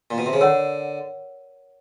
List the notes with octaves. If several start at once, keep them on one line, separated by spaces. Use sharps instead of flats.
A#2
B2
C3
C#3
D3 A#4 C#5 F#5 A5